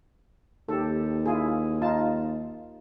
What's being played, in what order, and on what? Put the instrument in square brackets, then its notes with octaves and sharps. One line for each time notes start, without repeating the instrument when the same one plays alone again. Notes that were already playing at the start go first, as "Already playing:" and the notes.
[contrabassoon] D#2 [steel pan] G4 A4
[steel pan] E4 F4 G#4
D#4 F4 A5